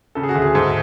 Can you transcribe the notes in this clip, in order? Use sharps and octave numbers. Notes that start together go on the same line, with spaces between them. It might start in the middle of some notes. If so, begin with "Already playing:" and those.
C#3 A4
G#4
F#4
D2
G#4
G#2 A4